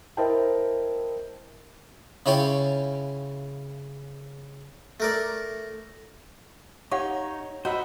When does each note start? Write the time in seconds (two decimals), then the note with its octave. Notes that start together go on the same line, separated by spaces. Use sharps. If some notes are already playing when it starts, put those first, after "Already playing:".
0.17 E4 A#4 C5 D#5 G5 A5
2.26 C#3 C#4 E4 F4 C#5 G5
5.00 A3 A#4 D5
6.92 D#4 G4 C#5 F5 F#5
7.65 D#4 F#4 C5 E5 B5